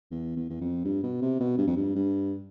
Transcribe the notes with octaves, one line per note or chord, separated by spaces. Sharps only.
E2
E2
E2
F2
G2
B2
C3
B2
G2
F2
G2
G2